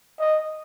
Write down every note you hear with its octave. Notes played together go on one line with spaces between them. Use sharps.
D#5